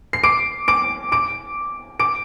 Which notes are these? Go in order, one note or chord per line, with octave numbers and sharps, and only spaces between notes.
C7
D6 D7
D6 D7
D6 D7
D6 D7